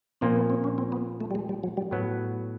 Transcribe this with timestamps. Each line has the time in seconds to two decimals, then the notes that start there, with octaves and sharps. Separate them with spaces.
0.21 A#2 F3 A#3 C4
0.36 B3
0.50 C4
0.64 C#4
0.78 C4
0.92 B3
1.20 A3
1.31 G3
1.35 G#3
1.49 G3
1.63 F#3
1.77 G3
1.91 A2 F#3 B3